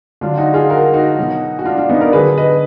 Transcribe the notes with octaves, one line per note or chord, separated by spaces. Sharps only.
D3 F#3 D4 F4
D#4 F#4
F4 G#4
F#4 A#4
D#4 F#4
B2 F#3
F#4
D4 F4
D4 F4
B3 D#4
A#4 D5
D3 F#3 G#4 B4
B4 D#5